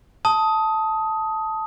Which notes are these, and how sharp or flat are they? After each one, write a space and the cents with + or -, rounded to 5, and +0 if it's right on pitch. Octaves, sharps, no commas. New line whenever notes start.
A5 +0 D#6 +15